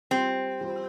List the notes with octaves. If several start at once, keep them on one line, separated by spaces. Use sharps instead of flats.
G3 C4 F4 C5
G3 F4 C5